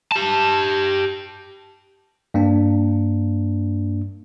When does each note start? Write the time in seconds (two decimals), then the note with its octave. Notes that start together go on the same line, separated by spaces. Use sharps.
0.12 G4 A5
2.34 G2 A#3 D4